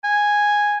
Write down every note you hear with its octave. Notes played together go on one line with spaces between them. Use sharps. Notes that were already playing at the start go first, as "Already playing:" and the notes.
G#5